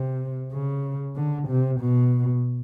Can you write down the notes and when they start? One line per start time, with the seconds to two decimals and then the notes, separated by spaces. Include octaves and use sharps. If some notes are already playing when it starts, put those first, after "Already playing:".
Already playing: C3
0.52 C#3
1.16 D3
1.48 C3
1.80 B2